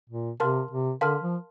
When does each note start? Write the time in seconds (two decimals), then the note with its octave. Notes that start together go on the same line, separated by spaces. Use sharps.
0.09 A#2
0.40 C3 A#4 F5 A5 C6 F6
0.71 C3
1.01 D3 A#4 F5 A5 C6 F6
1.22 F3